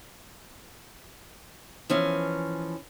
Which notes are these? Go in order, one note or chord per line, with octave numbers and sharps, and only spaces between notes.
E3 F3 C#4